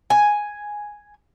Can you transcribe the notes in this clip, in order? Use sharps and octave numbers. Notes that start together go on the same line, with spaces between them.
G#5